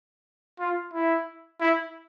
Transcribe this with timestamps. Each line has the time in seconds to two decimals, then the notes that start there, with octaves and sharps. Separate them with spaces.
0.59 F4
0.93 E4
1.60 E4